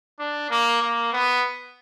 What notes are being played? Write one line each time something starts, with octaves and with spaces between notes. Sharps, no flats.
D4
A#3
A#3
B3